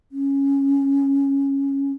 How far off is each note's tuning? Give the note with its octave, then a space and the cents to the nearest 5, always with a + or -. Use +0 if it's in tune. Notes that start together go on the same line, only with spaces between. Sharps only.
C#4 -5